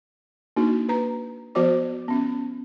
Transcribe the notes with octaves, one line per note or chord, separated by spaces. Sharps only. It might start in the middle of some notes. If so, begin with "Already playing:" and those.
A#3 D4 D#4 F#4
B4 A#5
F3 B3 F#4 C5 D5 D6
B3 C#4